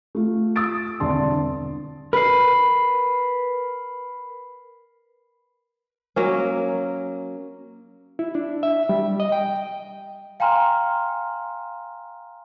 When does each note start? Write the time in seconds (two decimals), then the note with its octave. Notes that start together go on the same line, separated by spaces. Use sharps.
0.15 A3 F4
0.56 D#6 E6 A6 D7
1.00 E1 C2 D3 D5 A5 C6
2.13 A#4 B4 B5 C7
6.16 F#3 A#3 C#4
8.19 E4
8.35 D4
8.63 E5
8.89 G3
9.20 D#5
9.32 G5
10.40 F5 G5 G#5 A#5 C6 F6